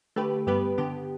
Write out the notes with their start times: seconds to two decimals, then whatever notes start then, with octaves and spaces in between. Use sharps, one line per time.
0.16 D3 A3 G4 B4
0.47 G2 G3 B3 G4 B4
0.78 D3 B3 G4